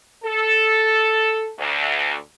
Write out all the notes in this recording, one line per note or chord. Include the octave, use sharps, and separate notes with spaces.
A4
D2